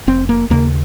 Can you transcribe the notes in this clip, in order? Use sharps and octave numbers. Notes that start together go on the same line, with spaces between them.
F1 C4
A#3
D#2 C#3 A#3